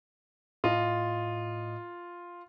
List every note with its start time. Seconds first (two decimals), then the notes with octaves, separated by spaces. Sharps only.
0.64 A2 F4 D#5